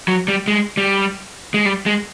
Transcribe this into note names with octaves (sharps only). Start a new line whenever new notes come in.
F#3
G3
G#3
G3
G#3
G3
G#3